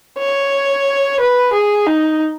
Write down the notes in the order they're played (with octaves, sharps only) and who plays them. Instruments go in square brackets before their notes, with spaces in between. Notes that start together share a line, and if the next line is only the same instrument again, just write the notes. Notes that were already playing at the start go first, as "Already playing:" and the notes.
[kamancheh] C#5
B4
G#4
D#4